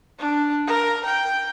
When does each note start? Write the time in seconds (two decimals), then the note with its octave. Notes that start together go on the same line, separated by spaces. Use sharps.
0.19 D4
0.67 A#4
1.05 G5